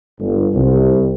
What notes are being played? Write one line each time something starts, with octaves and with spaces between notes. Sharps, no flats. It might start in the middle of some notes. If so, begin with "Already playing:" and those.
G1
C2